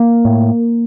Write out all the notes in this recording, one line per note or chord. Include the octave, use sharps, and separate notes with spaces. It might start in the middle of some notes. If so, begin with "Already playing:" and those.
Already playing: A#3
A2